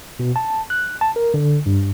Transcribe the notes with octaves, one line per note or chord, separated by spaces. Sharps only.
B2
A5
F#6
A5
A#4
D3
G2